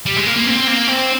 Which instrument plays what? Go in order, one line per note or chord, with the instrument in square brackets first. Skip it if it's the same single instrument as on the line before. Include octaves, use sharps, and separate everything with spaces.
[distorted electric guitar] G3
G#3
A#3
A#3
C4
A#3
C4